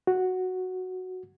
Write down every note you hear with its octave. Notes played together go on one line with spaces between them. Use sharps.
F#4